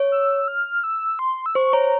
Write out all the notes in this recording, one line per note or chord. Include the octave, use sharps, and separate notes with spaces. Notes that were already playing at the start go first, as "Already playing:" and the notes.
Already playing: C#5
E6
F6
E6
C6
E6
C5 C#6
C#5 A#5